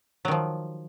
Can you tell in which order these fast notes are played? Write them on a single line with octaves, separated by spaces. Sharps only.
F#3 D#3 F3